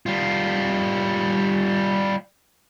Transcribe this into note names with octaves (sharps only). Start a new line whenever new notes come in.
G3 F4